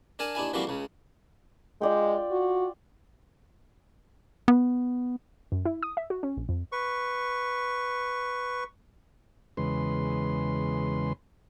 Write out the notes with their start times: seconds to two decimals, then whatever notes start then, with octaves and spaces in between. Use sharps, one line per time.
0.19 D4 A#4 G#5 A5
0.35 D#2 D4 E4 G#5
0.53 E3 F3 G3 A#3 C4 F#4
0.67 C#2 C#3
1.81 G#3 F4 D5 G5
2.31 F#4
4.48 B3
5.52 F#2
5.65 E4
5.83 D#6
5.97 E5
6.10 F#4
6.23 C#4
6.37 A#1
6.49 F2
6.72 B4 C#6
9.57 E2 C#3 G#3 B4 C6